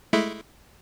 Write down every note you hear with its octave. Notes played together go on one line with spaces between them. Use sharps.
G#3 A3 E4